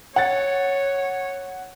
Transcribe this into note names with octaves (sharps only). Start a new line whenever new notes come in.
C#5 F#5 A6